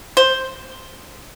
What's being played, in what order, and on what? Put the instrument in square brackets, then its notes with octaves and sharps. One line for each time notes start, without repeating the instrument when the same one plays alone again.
[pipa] C5